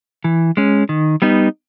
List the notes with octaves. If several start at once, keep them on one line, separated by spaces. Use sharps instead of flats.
E3
G#3 C#4
D#3
G3 B3 D#4